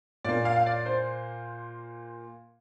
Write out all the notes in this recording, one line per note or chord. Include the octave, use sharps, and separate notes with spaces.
A#2 A#3 D5
F5
F5
D5
C5